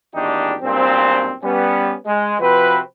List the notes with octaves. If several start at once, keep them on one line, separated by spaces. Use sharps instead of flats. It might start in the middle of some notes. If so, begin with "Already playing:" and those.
G#1 E2 A#2 D4 D#4 G4
B1 G2 A#2 C4
G3 B3 C#4
G#3
C3 F3 C4 F#4 B4